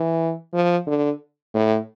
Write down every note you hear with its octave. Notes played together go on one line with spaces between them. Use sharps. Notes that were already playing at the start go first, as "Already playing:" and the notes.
Already playing: E3
F3
D3
A2